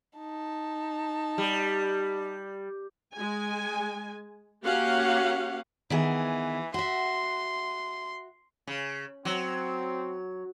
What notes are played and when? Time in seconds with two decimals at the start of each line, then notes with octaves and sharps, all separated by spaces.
0.18 D#4 A5
1.38 G3
3.15 G#3 G#5
4.64 A#3 C#4 F#4 G4 F5 F#5
5.90 D#3 E3 B3 G#4
6.74 F#4 E5 C6
8.67 C#3
9.25 F#3 C4